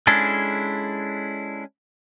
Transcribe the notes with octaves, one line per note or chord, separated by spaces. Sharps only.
G#3 C#4 D4 E4 G#4 A4